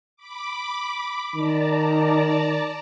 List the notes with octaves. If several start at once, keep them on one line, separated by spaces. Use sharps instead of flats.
B5 D6
D#3 D5 A5 A#5